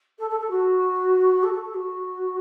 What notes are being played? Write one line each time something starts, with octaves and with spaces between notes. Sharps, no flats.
A4
A4
A4
F#4
A4
A4
A4
F#4